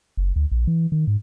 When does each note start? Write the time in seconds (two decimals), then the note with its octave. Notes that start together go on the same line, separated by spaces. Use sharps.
0.17 F#1
0.36 D2
0.51 A#1
0.67 E3
0.92 D#3
1.07 G#2